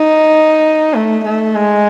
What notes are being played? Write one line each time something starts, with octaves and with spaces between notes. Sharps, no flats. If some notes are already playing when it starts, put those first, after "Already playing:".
Already playing: D#4
A3
A3
G#3